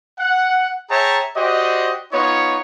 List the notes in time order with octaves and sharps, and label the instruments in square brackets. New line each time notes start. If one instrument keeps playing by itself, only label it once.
[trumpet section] F#5
G#4 C#5 E5 G5 A5 A#5
F#4 G4 C5 D5 D#5
B3 D#4 F4 C#5